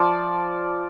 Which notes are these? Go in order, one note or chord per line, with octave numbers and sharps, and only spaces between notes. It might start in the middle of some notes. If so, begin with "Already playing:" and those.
Already playing: F3 D5